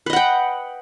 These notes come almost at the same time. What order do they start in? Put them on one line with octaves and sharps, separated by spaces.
B4 D#5 F#5 G5